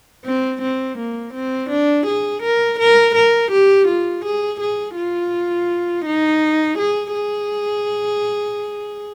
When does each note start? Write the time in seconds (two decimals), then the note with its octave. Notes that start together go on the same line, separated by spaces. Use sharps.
0.25 C4
0.62 C4
0.98 A#3
1.34 C4
1.70 D4
2.07 G#4
2.43 A#4
2.79 A#4
3.15 A#4
3.52 G4
3.88 F4
4.25 G#4
4.61 G#4
4.97 F4
6.06 D#4
6.78 G#4
7.14 G#4